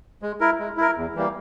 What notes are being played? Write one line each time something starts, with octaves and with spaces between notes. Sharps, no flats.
G#3
E4 A#4
G#3
E4 A#4
E2
E3 G3 A#3